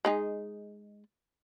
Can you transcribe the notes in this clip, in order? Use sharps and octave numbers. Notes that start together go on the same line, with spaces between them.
G#3 D#4 G#4